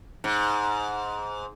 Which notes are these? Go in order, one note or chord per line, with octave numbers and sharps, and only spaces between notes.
G#2